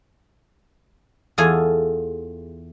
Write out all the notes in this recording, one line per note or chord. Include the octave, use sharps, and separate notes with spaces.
E2 F4 G#4 A4 G#5